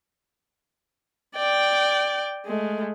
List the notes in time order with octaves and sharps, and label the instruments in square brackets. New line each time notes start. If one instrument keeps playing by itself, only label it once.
[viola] D5 G5
G#3 A3